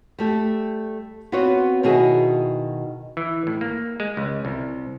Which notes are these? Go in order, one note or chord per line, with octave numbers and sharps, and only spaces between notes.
G3 A3 G4
B3 C4 F4 F#4 B4 C#5
B2 D#3 D#4 E4 F#4 G#4
E3
A2
A#3
G#3
C#2
C2